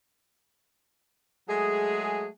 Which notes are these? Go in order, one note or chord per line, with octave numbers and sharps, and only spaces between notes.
F#3 G#3 A3 G#4